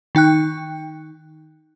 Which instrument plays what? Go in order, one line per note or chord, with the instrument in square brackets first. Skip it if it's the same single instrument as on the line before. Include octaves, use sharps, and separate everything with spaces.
[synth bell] D#3 D#4 G5 F#6